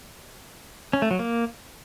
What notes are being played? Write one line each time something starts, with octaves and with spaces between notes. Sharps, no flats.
C#4
A3
F#3
A#3